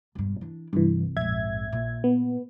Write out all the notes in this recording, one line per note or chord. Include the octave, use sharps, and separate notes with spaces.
E1 G2
E3 D4
C2 G2 E3
A#1 F2 G#2 E5 G#6
A#2
B3